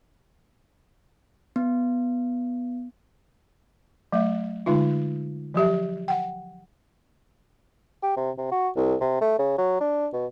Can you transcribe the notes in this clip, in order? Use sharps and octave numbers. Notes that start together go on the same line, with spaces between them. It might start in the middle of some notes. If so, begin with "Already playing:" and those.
B3
F#3 A3 E5
D3 G#3 D#4 F4
F3 F#3 G4 E5
F#5 G5
G4
C3
C3
F#4
C2
C3
A3
C#3
F#3
D4
B2